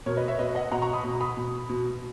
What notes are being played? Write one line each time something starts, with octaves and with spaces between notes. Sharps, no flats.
B2 A#4 C#5
B4 D#5
C#5 E5
B2 B4 D#5
D#5 F#5
B2 F#5 A#5
A#5 C#6
B5 D#6
B2
B5 D#6
B2
B2